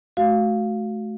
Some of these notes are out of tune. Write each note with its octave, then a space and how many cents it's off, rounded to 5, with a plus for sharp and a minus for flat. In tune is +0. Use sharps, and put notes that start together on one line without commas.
A3 -30 F#4 +0 F5 +0